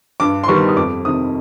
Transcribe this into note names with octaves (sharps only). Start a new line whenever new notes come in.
G2 D6
C6
D#3 G3 B3 C#6
D#6
F2 D6
C3 D#3 D#6